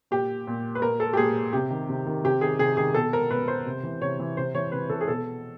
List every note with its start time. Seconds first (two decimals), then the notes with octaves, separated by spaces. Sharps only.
0.11 A#2 G4
0.47 A#2
0.75 B4
0.82 A#2 A#4
1.00 A4
1.13 G4
1.17 A#2 G#4
1.53 C3 G4
1.70 D#3
1.89 C3
2.06 D#3
2.24 C3 G4
2.41 D#3 G#4
2.59 C3 G#4
2.77 D#3 G#4
2.94 B2 A4
3.13 A#4
3.30 B2 B4
3.48 C5
3.66 C3
3.83 E3
4.01 C3 C#5
4.20 E3
4.37 C3 C5
4.54 E3 C#5
4.72 C3 B4
4.90 E3 A4
5.01 G#4
5.08 B2 A4